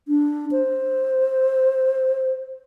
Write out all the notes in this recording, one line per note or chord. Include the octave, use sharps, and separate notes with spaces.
D4
C5